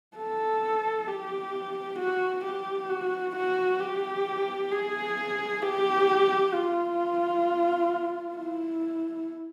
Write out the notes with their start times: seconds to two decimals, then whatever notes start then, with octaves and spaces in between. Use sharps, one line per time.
0.17 A4
1.08 G4
1.99 F#4
2.44 G4
2.89 F#4
3.35 F#4
3.80 G4
4.71 G#4
5.62 G4
6.53 F4
8.35 E4